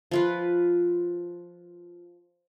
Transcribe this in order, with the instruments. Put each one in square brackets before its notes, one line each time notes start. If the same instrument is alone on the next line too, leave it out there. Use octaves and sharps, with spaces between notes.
[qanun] F3 F4 B4